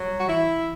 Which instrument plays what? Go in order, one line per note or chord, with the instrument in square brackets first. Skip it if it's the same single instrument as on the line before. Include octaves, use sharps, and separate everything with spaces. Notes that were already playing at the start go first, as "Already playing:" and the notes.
Already playing: [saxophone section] F#3 [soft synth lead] G3
[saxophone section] F#4
[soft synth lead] E3 [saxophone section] E4